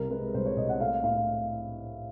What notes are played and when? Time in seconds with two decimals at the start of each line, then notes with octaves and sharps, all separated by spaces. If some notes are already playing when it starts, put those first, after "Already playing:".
Already playing: C2 G3 A#4
0.11 G#3 B4
0.34 C2 C5
0.46 C#5
0.57 C2 D#5
0.69 F#5
0.80 A3 F5
1.03 A2 F5